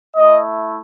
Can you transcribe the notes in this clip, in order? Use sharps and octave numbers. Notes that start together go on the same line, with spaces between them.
A3 E4 D#5